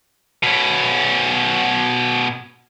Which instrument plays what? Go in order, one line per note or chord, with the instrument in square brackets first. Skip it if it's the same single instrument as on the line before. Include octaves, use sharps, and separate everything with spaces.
[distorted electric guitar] B2 C#4